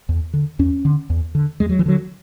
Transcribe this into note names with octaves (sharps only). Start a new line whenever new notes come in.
E2
D3
E2 C#4
D3
E2
D3
E2 G#3
F#3
E3
D3 F#3